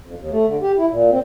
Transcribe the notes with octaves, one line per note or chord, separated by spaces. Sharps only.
F2
D#2
A3
D3
G4
E4
A#2
C4